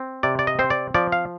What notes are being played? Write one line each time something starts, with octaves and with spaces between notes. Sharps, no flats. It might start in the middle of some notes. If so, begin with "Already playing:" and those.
Already playing: C4
C3 D5
D5
D#5
C4 C5
D5
F3 D5
F5